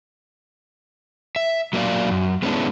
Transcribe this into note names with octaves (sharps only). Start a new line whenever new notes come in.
E5
F#3 A#3 C4 D5 F5
F#2
G#3 B3 C#4 D4 E4